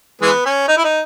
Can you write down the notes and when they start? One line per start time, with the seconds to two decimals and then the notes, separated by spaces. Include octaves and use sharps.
0.22 E3 G#3 B3
0.45 C#4
0.68 D#4
0.77 E4
0.84 D#4